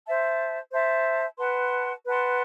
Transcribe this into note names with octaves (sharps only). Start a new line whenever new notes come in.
C5 E5 A5
C5 E5 A5
B4 F#5 A5 C6
B4 F#5 A5 C6